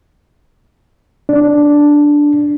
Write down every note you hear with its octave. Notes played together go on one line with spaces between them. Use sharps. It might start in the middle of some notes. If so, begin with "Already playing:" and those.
D4